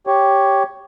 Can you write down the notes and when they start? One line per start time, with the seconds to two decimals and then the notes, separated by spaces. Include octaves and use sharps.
0.07 G4 C#5